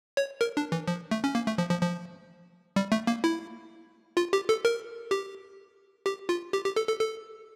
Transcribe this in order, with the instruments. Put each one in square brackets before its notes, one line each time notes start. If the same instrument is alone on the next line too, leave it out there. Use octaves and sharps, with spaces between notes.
[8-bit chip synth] C#5
A#4
D4
E3
F3
A3
C#4
A#3
A3
F3
F3
F3
G3
A3
A#3
E4
F4
G4
A4
A#4
G4
G4
F4
G4
G4
A4
A4
A4